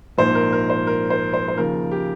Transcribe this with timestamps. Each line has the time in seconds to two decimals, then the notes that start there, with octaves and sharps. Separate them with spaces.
0.18 A#1 G#2 F3 C5
0.35 A#4
0.53 A#4
0.70 C5
0.87 A#4
1.10 C5
1.34 C5
1.48 C5
1.56 D#2 C#3 F3 A#4
1.91 G4